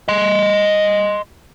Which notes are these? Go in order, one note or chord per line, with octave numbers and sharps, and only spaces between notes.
D#5 C6